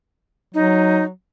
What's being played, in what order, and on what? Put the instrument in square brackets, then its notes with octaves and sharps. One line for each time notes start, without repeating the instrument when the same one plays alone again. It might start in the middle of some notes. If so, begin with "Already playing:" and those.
[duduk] F#3 [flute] D#4